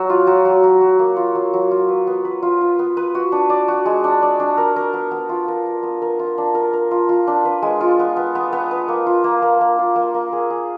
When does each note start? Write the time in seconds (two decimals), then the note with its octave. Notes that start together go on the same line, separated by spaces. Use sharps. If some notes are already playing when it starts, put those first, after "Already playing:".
Already playing: F#3
0.10 F4
0.27 F#3
0.45 F#3
0.64 F#3
0.81 F#3
0.99 A#3
1.16 F4
1.35 F#3
1.53 F#3
1.71 F4
1.89 B4
2.07 B3
2.25 B4
2.43 F4
2.61 F4
2.79 B3
2.97 B4
3.15 F#4
3.32 D4
3.50 D5
3.68 F#4
3.86 G#3
4.04 D4
4.22 D5
4.40 D4
4.57 A#4
4.76 A#4
4.94 B3
5.11 B3
5.29 F4
5.48 A#4
5.66 A#4
5.83 B3
6.02 A#4
6.19 F4
6.38 D4
6.55 A#4
6.73 A#4
6.91 F4
7.09 F4
7.27 D4
7.45 B4
7.62 G#3
7.81 F4
7.99 B3
8.16 B3
8.35 B3
8.53 B3
8.71 B4
8.88 A#3
9.07 F4
9.24 A#3
9.42 A#3
9.61 A#3
9.79 F4
9.96 A#3
10.14 A#3
10.33 G#4
10.50 G#4